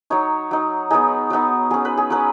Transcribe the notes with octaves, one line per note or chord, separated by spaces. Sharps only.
F#3 D#4 C#5
F#3 D#4
F#3 B3 D#4 G#4
F#3 B3 D#4
F#3 C#4 G#4
B4
G#4
F#3 C#4 B4